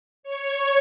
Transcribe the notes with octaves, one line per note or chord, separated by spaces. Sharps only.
C#5